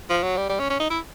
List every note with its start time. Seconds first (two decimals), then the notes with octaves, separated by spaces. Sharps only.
0.10 F3
0.23 F#3
0.37 G3
0.50 G3
0.60 C#4
0.70 C#4
0.80 D#4
0.90 E4